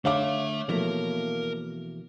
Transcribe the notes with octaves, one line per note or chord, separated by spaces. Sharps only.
D3 A3 C#5 E5 F5 D6
B2 E3 F3 A3 A#3 A#4